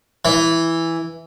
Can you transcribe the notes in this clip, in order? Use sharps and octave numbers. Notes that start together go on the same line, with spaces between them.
E3